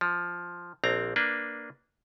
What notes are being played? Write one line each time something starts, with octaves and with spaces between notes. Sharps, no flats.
F3
A#1 C4 A#5
A#3 D4 B4